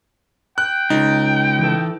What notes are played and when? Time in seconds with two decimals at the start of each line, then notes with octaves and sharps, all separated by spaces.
0.58 G5 F#6
0.90 C#2 D#4
1.59 E3 A4